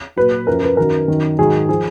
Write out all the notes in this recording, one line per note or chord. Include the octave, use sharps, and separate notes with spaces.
A#2 F#3 B4
F#2 F3 A#4
B4
F#2 D#3 F#3 A#4
F#2 D#3 F#3
G#2 D#3 F#3 G#4
F3 G#4